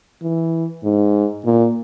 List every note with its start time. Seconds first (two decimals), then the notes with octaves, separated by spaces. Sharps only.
0.22 E3
0.84 G#2
1.45 A#2